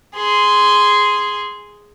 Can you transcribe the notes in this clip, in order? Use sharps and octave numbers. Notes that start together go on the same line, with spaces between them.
G#4 C6